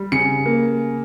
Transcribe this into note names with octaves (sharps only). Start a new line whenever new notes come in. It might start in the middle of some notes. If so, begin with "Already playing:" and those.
Already playing: G3
C#3 C#7
A#3